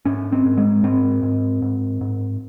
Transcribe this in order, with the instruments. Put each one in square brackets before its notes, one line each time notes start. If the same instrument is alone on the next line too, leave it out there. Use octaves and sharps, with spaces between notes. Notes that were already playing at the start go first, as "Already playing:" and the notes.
[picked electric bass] G#2 C#4
C4
G#2
G#3
G#2 C4
G#2
G#2
G#2